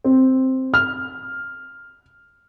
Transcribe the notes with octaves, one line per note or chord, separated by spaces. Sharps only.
C4
F6